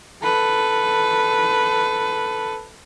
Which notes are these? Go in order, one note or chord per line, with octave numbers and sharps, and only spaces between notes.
A4 B4